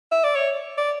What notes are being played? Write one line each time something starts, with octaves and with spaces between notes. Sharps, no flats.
E5
D5
C#5
D5